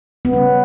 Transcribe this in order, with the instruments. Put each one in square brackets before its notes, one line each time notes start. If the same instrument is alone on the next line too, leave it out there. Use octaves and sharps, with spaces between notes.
[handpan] B3
C#3 G3 C#4